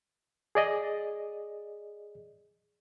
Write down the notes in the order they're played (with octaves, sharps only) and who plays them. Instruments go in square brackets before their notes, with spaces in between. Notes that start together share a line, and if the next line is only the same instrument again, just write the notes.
[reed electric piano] G#4 D5 D#5